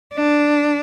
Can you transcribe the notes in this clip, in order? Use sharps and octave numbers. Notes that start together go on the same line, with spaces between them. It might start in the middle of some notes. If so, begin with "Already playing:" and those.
D4